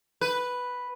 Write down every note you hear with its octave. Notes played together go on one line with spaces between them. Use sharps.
B4